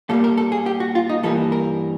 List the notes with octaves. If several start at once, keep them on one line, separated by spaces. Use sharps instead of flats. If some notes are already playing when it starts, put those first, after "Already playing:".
A#2 G3 A#3 A4
A#4
A4
G#4
G4
F#4
F4
D#4
G2 E3 G3 A#3 A4
A#4